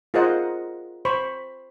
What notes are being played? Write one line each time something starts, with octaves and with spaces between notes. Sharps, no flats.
F4 G#4 A#4 C5 D#5 F#5
C5 B5 C#6